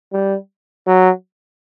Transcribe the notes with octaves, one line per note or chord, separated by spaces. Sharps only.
G3
F#3